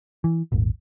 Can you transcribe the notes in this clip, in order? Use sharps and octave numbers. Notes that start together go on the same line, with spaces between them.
E3
D#1 G#1